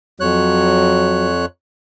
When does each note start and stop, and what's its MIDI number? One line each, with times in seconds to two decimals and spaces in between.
0.20 1.45 41
0.20 1.29 54
0.20 1.45 73
0.20 1.45 90